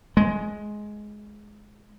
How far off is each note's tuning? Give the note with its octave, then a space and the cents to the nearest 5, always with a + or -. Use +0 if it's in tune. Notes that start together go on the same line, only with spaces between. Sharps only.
G#3 +10